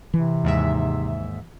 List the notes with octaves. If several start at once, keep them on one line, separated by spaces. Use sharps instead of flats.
C3 E3
D#2 G#2 E5